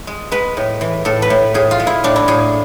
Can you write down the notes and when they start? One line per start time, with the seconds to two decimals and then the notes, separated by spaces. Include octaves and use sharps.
0.07 G#3
0.32 G#3 B4
0.57 A2
0.81 E3
1.05 A2 A4
1.22 B4
1.30 A2
1.54 A2 G#4
1.71 F4
1.80 G#3
1.87 E4
2.04 A2 D4
2.16 E4
2.28 A2 G#4